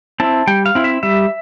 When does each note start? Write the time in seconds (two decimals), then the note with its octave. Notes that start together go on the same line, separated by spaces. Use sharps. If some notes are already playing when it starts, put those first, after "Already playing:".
0.20 C4 E4 A5
0.47 G3 G5
0.66 F5
0.75 C4 E4
0.84 E5
1.03 G3 E5